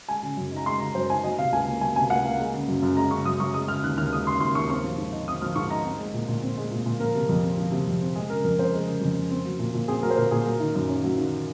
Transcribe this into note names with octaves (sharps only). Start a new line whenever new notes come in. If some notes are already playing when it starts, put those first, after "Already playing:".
G#3 G#5
C#3
F#2
D#4
A#5
G#3 C6
C#3 A#5
F#2 C5
D#4 G#5
F#3 D#5
C3 F5
C#2 G#5
A#3
F#3 G#5
C3 G#5
C#2 F#5
A#3 F5
G#3
C#3
F#2
F#2
G#3 A#5
C#3 C#6
F#2 D#6
F#2 C#6
G#3 D#6
C#3 F6
D#2 F#6
D#2 F6
G#3 D#6
C#3 C6
D#2 C6
D#2 C#6
C4 C#6
F3
G#2
D#4
C4 D#6
F3 F6
G#2 C#6
D#4 A#5
C4
G#3
A#2
A#2
C4
G#3
A#2
A#2
F3 A#4
C3
F2
C4
F3
C3
F2
C4
G#3 G#4
C#3 A#4
F2 A#4
F2 C5
G#3 A#4
C#3
F2
F2
C4
F#3
A#2
A#2
C4 G#4
F#3 A#4
C5
A#2 A#4
A#2 G#4
F#3 A#4
D#3
F#2
C#4
F#3
D#3